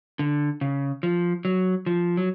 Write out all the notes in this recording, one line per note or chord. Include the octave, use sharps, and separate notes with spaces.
D3
C#3
F3
F#3
F3
F#3